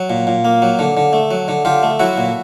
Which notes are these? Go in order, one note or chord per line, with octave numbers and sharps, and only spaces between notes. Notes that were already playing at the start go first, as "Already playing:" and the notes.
Already playing: F#3
A#2
A#2
A#3
F#3
D3
D3
A3
F#3
D3
D3 F4 G4
A3
F#3 E4 F#4
A#2